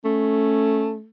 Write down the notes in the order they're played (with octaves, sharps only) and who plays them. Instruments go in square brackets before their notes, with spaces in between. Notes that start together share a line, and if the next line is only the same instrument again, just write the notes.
[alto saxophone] A3 [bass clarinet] C#4